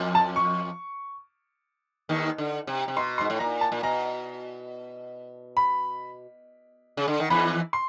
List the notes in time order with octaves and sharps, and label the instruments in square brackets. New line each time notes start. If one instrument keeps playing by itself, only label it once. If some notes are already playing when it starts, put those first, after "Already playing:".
Already playing: [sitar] F2 F3
[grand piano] A5
C#6
[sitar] D#2 D#3
D3
C3
C3
[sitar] B2 [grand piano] C6
[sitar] G#2 [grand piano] C6
[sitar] A2
[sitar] A#2 [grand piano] A#5
[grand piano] A5
[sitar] A#2
[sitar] B2 [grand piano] A#5
[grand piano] B5
[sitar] C#3
D3
D#3
[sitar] E2 E3 [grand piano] B5
[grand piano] C6